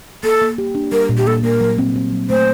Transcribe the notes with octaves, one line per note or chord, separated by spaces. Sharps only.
A#3 A4
A#3
G4
D4
G3 A#4
A#2
G4
A#3 A4
A#3 A#4
F#3
C4
C4
F#3
A3 C5